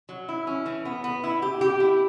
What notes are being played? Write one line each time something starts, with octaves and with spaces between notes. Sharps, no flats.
F#3
E4
C#4
E3
B3
B3
E4
G4
G4
E4